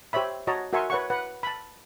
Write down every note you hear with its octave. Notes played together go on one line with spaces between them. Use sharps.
G4 C5 C#5 E5 B5
F#4 C#5 D#5 A5 A#5
F#4 A#4 E5 G#5 C6 C#6
B4 C#5 F#5 C#6
B4 F#5
A5 B5